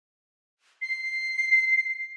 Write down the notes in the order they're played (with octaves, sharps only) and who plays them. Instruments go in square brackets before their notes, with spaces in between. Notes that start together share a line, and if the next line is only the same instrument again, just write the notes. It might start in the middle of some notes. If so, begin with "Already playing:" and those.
[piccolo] C7